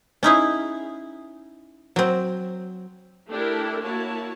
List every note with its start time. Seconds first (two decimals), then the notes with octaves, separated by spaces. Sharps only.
0.23 C#4 D#4 E4 G#4
1.96 F#3 C4
3.29 A3 D4 E4 G4 A4 A#4
3.83 A#3 E4 F#4 C#5 A5